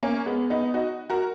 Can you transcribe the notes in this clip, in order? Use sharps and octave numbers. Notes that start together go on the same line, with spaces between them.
A#3 C#4
G#3 B3
B3 D#4
D#4 F#4
F#4 A#4